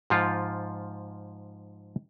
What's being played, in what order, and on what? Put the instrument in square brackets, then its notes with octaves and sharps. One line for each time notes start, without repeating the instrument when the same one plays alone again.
[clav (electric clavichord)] G#2 F3 F4